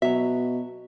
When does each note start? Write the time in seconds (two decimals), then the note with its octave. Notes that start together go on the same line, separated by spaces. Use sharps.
0.02 B2 F#3 E5